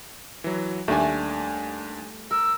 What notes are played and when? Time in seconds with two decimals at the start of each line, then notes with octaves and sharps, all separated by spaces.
0.44 E3 F#3
0.88 D#2 G3 A3 D4 G#5
2.31 A#4 E6